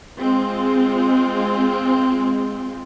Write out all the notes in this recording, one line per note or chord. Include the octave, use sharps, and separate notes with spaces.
G#3 C4 F4